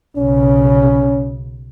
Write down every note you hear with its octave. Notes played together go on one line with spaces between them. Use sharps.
B1 C#3 C#4